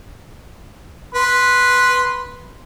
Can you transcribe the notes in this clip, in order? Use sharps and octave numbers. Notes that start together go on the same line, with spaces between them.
B4 C6